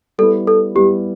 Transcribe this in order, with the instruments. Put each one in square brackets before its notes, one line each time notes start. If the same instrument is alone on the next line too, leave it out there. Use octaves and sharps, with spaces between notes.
[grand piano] G3 B3 E4 [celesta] A4
[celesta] A4
[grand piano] G3 B3 E4 [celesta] G4